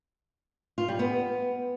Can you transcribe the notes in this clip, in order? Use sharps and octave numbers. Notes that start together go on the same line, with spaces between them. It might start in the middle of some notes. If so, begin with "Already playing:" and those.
F4
G3
B3